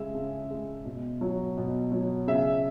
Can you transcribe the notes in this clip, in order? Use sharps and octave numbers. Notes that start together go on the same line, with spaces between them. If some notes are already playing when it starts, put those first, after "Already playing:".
Already playing: C#3 G#3 E5
C#3
G#3
B2
F#3
B2
F#3
C#3 E5